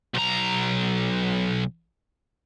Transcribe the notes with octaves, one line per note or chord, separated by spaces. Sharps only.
B1 A#5